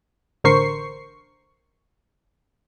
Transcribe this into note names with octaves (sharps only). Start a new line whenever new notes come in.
A1 D3 A#4 C5 C#6 C7